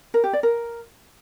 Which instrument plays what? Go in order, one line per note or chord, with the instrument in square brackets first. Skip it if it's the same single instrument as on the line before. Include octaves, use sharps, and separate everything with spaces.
[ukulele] A#4
G4
D5
A#4